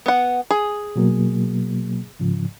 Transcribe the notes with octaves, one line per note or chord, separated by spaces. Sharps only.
B3 F#5
G#4
B2 F#3 A#3
G#2 C#3 F3